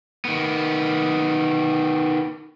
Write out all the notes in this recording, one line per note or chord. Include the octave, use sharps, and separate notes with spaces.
D#3 B3